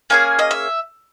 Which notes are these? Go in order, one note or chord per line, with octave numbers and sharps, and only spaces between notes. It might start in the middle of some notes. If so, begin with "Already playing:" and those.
A#3 C#4 G#4 G#5
D#5
E5